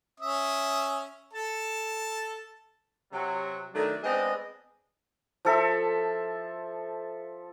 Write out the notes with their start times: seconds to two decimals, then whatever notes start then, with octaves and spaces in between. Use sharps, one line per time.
0.20 C#4 E5 D#6
1.33 A4 A5
3.12 C3 F#3
3.73 D#3 F#3 A3 D4
4.03 G#3 B3 C4 D4 D#5
5.45 F3 A4 E5